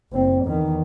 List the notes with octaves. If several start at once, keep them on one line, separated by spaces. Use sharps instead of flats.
F#1 C4
E2 D#3